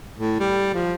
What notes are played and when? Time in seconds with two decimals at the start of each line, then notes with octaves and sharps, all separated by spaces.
0.18 A2
0.40 G3
0.74 F3